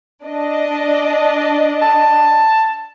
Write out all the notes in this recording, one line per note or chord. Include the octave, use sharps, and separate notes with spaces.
D4 D#5
A5